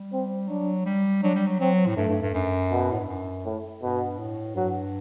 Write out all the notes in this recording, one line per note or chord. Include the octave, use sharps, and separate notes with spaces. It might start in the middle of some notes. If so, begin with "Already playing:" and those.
Already playing: G3
C4
F#3 D4
G3
F#3 D4
G3
F#3
F#3 C4
A2
G2 A3
G2
G2
F#2
B2
A2
G2
F#2
A2
G2 B2
A2
G2 F#3